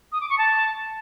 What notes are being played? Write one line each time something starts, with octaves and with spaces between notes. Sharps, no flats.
D#6
D6
C#6
A5